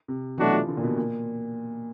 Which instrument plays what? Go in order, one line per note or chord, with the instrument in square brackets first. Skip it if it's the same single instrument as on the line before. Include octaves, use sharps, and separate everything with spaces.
[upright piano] C3
[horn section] B2 F#3 A3 D4 F#4 [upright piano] E3
[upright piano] F3
D3
A#2
B2
A#2